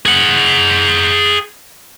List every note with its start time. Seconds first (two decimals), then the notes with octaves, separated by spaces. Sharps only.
0.06 G#4 F#5